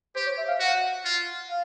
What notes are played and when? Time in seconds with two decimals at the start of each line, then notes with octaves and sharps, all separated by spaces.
0.16 G4 C5
0.26 C#5
0.38 E5
0.48 F5
0.60 F#4 F#5
1.05 F4
1.49 F5